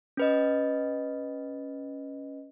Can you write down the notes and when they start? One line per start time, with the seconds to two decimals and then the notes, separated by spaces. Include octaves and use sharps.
0.17 C#4 B4 D#5